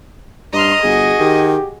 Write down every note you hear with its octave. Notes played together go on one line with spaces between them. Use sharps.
G2 D#5 A#5 C6 F6
G1 F#4 G#4
D#3 G4